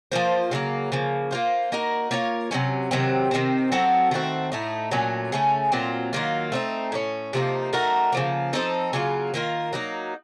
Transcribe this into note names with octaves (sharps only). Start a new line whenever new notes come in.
F3 A#3 F4 C5
C#3 F#3 A#3
C#3 F3 A#3
A#3 F4 C5
A#3 D#4 F#4 A#4
A#3 F4 A#4 C#5
C3 F#3 A#3 C#4
C3 D#3 F#3 C4
C3 D#3 F#3 C4
F#3 C4 F#4 A4
D#3 A3 C4 F#4
A2 A3 D#4
A#2 F#3 A3 C#4
C#3 A3 C#4
A#2 F#3 C4 F4
D#3 F#3 A#3 F4
A3 C4 D#4
A2 A3 C#4
C3 F3 A#3 D#4
A3 D#4 F#4 A#4
C#3 F3 A#3
F3 C4 D#4 A4
C#3 F#3 A#3 F4
D#3 A#3 F4 A#4
F#3 A#3 D#4